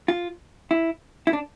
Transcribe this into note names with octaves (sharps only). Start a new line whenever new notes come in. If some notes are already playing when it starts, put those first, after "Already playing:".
F4
E4
E4
D4